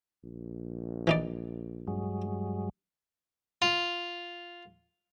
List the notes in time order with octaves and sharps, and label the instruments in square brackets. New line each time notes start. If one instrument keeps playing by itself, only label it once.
[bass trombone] A#1
[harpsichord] E3 D#4 D5
[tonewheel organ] G2 F#3 G#3
[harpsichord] F4